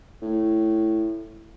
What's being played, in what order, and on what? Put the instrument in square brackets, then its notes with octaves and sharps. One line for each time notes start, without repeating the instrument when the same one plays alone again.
[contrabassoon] A2